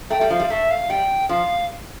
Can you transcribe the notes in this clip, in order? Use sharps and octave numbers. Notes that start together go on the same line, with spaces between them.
A3 G5
G3
F3 F5
G3
A3 E5
F5
G3 G5
F3 F5